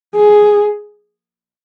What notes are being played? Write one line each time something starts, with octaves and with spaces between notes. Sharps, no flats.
G#4